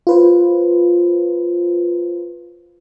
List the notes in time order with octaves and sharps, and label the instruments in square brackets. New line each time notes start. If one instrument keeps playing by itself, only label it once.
[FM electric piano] F4 B4 C5